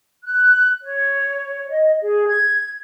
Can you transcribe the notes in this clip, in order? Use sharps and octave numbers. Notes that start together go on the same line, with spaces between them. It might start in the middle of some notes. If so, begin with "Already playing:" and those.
F#6
C#5
D#5
G#4
G#6